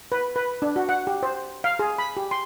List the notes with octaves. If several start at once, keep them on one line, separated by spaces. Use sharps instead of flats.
B4
B4
D4
F#4
F#5
G4
C5
F5
G#4
B5
G4
C6